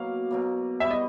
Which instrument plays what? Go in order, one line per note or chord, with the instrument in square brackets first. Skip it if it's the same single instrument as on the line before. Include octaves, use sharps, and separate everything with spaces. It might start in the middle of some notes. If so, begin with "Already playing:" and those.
Already playing: [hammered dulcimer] B2 F#3 A#3 [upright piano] F5
[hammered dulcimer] B2 F#3 A#3
[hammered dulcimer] B2 G3 B3 [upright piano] E5
[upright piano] D#5